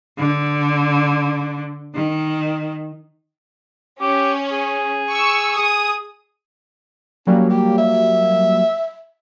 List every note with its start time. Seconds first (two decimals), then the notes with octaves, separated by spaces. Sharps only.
0.18 D3
1.95 D#3
4.01 C#4 G4
4.51 G#4
5.10 C#6 E6
5.58 G#4 D#6
7.27 F#3 G3 A#3 C#4
7.50 G4
7.78 E5